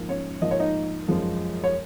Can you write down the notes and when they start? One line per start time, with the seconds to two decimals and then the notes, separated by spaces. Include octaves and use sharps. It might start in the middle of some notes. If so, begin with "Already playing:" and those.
Already playing: G#2 F3 A#3
0.09 C#4 C#5
0.42 G#2 F3 A#3 D#5
0.51 C#5
0.60 D#4 D#5
1.08 F#2 F3 G#3
1.64 C#5